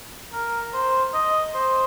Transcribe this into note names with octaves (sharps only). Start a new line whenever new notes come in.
A#4
C5
D#5
C5